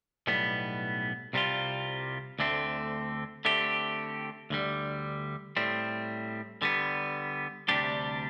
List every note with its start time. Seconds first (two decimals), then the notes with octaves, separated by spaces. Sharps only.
0.27 B1 A2 G3 B3
1.33 C2 C3 G3 C4 F4
2.39 D2 D3 A3 C4
3.45 D3 A3 C4 G4
4.50 D2 D3 G3
5.57 A2 G3 C4
6.62 D3 G3 B3
7.69 D2 C3 G3 D4 G4